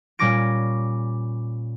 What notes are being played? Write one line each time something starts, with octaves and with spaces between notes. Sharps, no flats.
A#2 G3 C#4 D6 A#6 D7